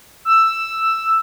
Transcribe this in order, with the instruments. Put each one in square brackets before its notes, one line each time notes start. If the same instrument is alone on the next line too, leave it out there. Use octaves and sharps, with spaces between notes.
[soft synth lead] E6